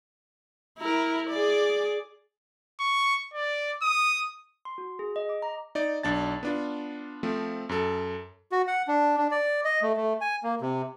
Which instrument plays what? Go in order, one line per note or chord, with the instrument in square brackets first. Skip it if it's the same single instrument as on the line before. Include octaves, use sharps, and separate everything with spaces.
[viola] E4 A#4
G#4 D5
[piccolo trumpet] C#6
D5
D#6
[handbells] C6
F#4
G#4
D#5
D6
A#5
[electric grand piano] D#4 D5
B1 D4 A5 A6
B3 D4 F4
F3 A3 C4
F#2 A4
[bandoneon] F#4
F#5
D4
D4
D5
D#5
A3
A3
G#5
A#3
C3